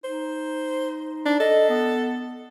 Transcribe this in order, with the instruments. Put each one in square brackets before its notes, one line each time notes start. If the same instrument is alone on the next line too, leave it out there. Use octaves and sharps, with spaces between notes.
[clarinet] D#4 [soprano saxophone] C5
[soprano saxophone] D4
[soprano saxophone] A4 [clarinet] D#5
[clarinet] B3